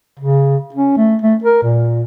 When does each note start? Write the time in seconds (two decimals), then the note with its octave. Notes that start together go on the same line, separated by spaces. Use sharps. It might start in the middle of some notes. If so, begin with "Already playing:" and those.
0.19 C#3
0.74 C#4
0.97 A3
1.22 A3
1.44 A#4
1.63 A#2